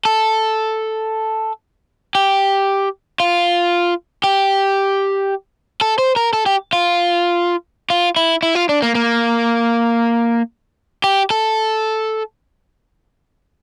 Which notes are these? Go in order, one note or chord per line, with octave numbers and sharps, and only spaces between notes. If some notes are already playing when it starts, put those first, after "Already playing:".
A4
G4
F4
G4
A4
C5
A#4
A4
G4
F4
F4
E4
E4
F4
D4
A#3
A#3
G4
A4